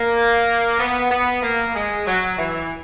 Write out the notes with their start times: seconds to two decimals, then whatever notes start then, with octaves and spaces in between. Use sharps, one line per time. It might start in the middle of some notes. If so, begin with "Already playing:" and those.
Already playing: A#3
0.79 B3
1.10 B3
1.42 A#3
1.74 G#3
2.06 F#3
2.38 E3